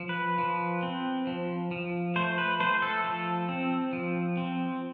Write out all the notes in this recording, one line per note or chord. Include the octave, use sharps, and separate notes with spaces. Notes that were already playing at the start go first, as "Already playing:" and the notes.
Already playing: F3
B4
F3
C4
F3
F3
A3 C5
B4
A3 C5
A4
F3
C4
F3
C4